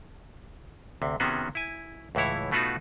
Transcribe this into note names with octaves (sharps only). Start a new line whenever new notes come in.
D2 C3
C3 D#3 B3 C#4 F#4 G#4
E4 G#5
C#2 A2 E3 E4 C#5
B2 A3 B3 D#4 F4 F#4